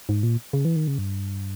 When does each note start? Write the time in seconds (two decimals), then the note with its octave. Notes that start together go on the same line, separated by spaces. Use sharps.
0.09 G#2
0.23 A#2
0.53 C#3
0.65 E3
0.76 D#3
0.88 C#3
0.98 G2